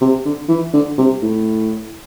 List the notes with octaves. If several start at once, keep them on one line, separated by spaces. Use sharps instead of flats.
C3
D3
E3
D3
C3
A2